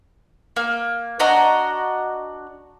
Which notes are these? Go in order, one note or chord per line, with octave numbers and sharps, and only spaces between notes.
A#3
D4 F#4 D#5 A#5